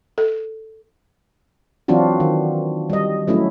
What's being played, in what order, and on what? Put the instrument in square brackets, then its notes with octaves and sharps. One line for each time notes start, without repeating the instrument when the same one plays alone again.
[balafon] A4
[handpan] E3 F#3 C4 D4 F4 F#4
D#3
G3 D#5
F#3 A3 C#4 E4